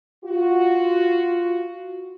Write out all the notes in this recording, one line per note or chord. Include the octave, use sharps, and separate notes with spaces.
F4 F#4